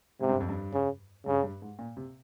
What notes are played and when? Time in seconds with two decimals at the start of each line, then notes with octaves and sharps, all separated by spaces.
0.20 G#2 C3
0.29 G2
0.40 F2
0.49 G2
0.73 C#3
1.26 G2 C#3
1.43 G2
1.62 G#2
1.79 A#2
1.97 C3